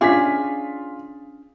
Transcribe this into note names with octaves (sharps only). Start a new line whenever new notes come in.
C#4 D4 F4 G#4 B6